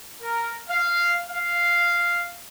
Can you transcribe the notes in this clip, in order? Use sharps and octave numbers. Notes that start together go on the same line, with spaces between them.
A#4
F5
F5